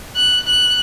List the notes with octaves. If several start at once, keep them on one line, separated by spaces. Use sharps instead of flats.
F#6
F#6